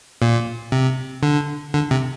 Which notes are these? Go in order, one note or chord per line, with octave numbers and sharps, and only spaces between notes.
A#2
C3
D3
D3
C3